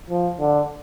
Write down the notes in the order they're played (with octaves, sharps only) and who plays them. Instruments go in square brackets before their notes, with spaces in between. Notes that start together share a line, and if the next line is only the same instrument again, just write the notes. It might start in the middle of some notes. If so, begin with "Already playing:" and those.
[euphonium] F3
D3